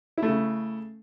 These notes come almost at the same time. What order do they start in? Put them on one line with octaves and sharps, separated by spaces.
E4 A3 C#3